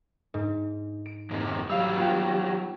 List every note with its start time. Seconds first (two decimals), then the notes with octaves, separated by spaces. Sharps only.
0.34 G#2
1.06 D7
1.31 F2 G#2 C3
1.70 F#3 G3 F5 E6
1.97 B3 F4 G5